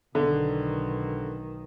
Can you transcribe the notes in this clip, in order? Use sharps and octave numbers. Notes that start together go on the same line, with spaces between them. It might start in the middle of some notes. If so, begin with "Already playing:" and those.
B1 D3 D#3